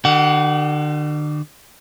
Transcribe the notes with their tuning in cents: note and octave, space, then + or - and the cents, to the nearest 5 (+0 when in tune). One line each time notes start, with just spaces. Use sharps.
D3 +40 G4 -35 F#5 +0